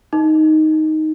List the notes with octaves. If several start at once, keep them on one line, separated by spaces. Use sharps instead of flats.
D#4